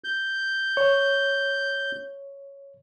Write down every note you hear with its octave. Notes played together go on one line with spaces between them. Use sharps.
G6
C#5